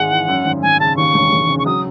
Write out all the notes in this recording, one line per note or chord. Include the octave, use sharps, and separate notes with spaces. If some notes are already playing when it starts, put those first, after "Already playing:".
Already playing: G#1 G#3 F#5
E3
F#2
G#1
G#1 G#5
C#3 A5
D#2 C#6
E1
E1
C#3
C#6
F#3 D#6